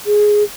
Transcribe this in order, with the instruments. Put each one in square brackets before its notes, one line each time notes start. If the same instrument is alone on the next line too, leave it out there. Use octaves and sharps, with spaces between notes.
[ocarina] G#4